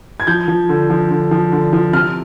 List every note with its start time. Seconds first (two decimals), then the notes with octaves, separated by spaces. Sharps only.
0.20 G#6
0.27 F3 G6
0.48 F3
0.69 D3
0.90 F3
1.10 D3
1.31 F3
1.52 D3
1.73 F3
1.93 C3 F6